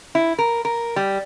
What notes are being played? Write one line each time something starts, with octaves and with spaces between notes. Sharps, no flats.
E4
A#4
A#4
G3